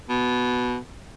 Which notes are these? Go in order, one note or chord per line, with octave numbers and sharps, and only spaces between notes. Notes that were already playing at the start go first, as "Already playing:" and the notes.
B2